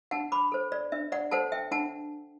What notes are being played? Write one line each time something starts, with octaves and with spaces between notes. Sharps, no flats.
D4 F#5 A5
B5 D6
A4 C5
D5
D4 E5
D5 F#5
A4 C5 F#5 A5
E5 G5
D4 F#5 A5